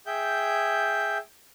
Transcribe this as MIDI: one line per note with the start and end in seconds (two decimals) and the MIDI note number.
0.06 1.18 68
0.06 1.18 76
0.06 1.18 79
0.06 1.18 91